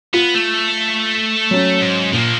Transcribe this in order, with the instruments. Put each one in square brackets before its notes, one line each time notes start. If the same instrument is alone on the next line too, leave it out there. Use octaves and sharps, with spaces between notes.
[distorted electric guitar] B3 [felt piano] F4
[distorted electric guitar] A3
[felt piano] F#3 C#4
[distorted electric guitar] G#2
[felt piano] A#2 [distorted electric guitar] F3 A#3